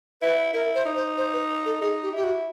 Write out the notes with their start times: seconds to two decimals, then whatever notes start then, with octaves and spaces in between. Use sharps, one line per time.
0.22 E4 B4
0.53 E4 A#4
0.75 C5
0.85 D#4
0.96 C5
1.17 C5
1.33 B4
1.65 A4
1.81 D#4 G#4
2.03 G4
2.13 E4 G4
2.24 F#4